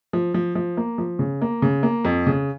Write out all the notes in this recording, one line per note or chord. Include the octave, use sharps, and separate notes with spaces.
F3
F3
F3
A#3
F3
C#3
A#3
C#3
A#3
F2
C#3